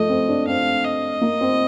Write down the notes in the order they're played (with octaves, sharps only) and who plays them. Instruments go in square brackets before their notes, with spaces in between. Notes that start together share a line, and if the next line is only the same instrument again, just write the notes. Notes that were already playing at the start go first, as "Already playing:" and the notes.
Already playing: [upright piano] F3 A3 [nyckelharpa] D#5
[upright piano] C4
D4
[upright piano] C4 [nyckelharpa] F5
[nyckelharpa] D#5
[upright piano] A#3
C4